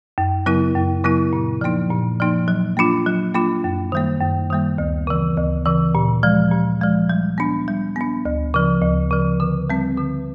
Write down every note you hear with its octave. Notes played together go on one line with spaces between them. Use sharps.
F#2
C#3 F#3 B3 E4
F#2
C#3 F#3 B3 E4
A#2
F3 A#3 D#4
A#2
F3 A#3 D#4
F#3
A#3 D4 F4
F#3
A#3 D4 F4
F#2
D#3 G3 A#3
F#2
D#3 G3 A#3
D2
C#3 E3
D2
C#3 E3
A#2
F3 G#3
A#2
F3 G#3
G3
B3 D4
G3
B3 D4
D2
C#3 F3
D2
C#3 F3
D3
G3 C4
D3